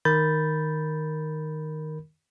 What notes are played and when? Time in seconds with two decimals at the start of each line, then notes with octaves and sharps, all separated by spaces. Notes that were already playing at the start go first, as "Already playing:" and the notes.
0.05 D#3 A#4 B5 G6 A6